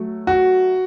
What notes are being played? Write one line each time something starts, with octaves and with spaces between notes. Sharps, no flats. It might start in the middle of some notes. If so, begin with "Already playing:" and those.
Already playing: F#3 A3
F#4